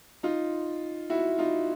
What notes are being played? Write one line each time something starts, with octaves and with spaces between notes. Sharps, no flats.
D#4 F4
E4 F#4
D#4 F4